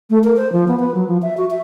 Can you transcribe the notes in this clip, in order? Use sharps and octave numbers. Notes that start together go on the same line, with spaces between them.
A3
A#4
C5
F3
B3
B4
F#3
F3
E5
F#4
E5